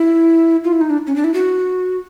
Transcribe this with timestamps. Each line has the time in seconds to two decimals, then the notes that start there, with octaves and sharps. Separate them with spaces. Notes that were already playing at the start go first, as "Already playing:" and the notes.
Already playing: E4
0.64 F4
0.73 E4
0.81 D#4
0.90 D4
1.07 C#4
1.16 D4
1.24 E4
1.34 F#4